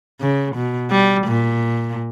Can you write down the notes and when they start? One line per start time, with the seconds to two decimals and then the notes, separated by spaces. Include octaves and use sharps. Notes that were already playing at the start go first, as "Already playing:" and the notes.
0.21 C#3
0.56 B2
0.91 G3
1.27 A#2